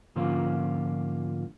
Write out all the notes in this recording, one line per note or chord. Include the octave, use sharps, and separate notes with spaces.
G#2 D3 F3 A#3 C#4 F4